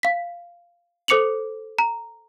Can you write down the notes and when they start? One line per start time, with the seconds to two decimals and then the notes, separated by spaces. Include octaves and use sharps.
0.03 F5 B6
1.08 A4 C5 D6 C#7 F7 F#7
1.79 A#5